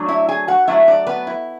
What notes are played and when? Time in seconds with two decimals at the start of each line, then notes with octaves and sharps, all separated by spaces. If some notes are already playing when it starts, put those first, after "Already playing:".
Already playing: F#3 A3 D4
0.09 E4 E5
0.29 G#4 G#5
0.48 F#4 F#5
0.68 F#3 A3 D4 E4 E5
0.87 D4 D5
1.07 B3 B4
1.27 E4